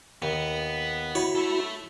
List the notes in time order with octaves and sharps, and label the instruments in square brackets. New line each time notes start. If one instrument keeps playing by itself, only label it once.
[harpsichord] D#2 [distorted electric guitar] B3
[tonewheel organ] E4 F#4 B5 [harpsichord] C#5
[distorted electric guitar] A4 E5